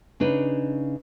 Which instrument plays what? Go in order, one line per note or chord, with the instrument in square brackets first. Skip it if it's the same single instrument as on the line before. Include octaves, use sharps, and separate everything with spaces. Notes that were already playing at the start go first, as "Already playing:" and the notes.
[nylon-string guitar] C#3 D4 D#4 B4